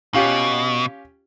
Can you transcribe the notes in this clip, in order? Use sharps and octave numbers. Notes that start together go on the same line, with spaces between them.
B2 C#4 F4 G4